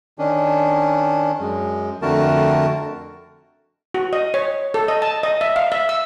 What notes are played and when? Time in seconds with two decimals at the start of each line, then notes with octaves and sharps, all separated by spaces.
0.19 D#3 C#4 D4
1.40 F#2 G#3
2.02 F2 D3 A3 F#4 A#4 A5
3.94 F#4
4.13 D#5
4.34 C#5
4.74 A4
4.88 D#5
5.02 A5
5.23 D#5
5.41 E5
5.56 F5
5.72 E5
5.89 E6